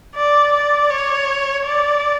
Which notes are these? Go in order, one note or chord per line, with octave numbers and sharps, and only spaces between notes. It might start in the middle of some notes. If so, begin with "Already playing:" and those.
D5
D5
C#5
D5